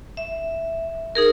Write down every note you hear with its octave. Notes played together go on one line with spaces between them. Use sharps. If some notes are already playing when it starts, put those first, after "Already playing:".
E5
D#4 G#4 A#4